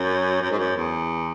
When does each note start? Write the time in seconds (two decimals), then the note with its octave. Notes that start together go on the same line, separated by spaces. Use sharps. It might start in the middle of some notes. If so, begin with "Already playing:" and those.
Already playing: F#2
0.42 F#2
0.51 G#2
0.59 F#2
0.76 E2